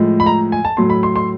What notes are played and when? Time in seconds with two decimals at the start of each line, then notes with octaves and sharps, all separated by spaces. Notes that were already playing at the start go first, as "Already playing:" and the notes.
Already playing: A2 F3 G#3
0.20 B5
0.26 A#5
0.52 G#5
0.65 A5
0.77 A2 F#3 A3 C6
0.90 B5
1.03 C6
1.16 C6